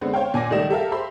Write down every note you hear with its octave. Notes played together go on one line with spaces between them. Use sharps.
D3 G#3 B3 C4
C5 C#5 F5 G5
A#2 G#5 D6 A#6
C#2 D#3 G3 A3 D#5 E7
G4 A4 A#4 E5 F5
G4 C5 E5 B5 C6 E6